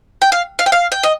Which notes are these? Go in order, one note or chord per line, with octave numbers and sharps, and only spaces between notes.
G5
F5
F5
G5
F5
G5
D#5